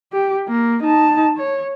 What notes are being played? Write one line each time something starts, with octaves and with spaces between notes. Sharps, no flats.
G4
A#3
D#4 A5
C#5